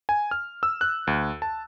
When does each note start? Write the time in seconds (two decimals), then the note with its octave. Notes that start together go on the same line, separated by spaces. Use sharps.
0.09 G#5
0.31 F6
0.63 E6
0.81 F#6
1.07 D2
1.42 A5